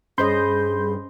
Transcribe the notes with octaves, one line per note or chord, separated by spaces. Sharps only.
G2 C#4 G#4 C5 D#5 B5 C6 G6